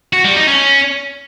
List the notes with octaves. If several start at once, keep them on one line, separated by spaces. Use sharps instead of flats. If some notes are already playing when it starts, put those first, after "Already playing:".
F#4
G3
D#4
C#4